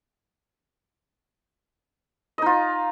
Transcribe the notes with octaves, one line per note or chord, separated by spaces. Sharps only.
D#4 F4 D#5